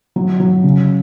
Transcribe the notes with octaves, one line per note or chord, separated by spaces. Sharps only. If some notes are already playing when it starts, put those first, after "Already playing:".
F#3
F#3
C#3